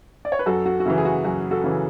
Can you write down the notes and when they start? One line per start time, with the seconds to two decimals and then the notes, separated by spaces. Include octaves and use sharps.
0.25 D5
0.32 C#5
0.39 B4
0.46 F#2 F#4 A4
0.66 F#4
0.80 F#4
0.86 C#3 E3 E4
0.98 G#4
1.05 F#4
1.25 F#2 F#4
1.51 F#4 A4
1.64 C#3 E3